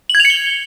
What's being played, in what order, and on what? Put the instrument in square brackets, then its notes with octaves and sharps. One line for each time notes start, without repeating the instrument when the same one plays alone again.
[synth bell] F#7
G#6
F7
C#7
G7